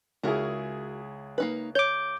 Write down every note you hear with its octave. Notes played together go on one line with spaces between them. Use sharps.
C#2 E4 F#4 G#4 A#4
A#3 D#4 B4
C#5 D6 G6